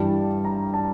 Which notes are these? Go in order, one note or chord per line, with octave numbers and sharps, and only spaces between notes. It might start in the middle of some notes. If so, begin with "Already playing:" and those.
Already playing: G2 E3 G3 A5
A#5
A5